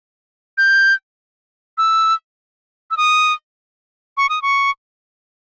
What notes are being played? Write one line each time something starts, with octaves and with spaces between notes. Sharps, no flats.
G6
E6
E6
D#6
C#6
D#6
C#6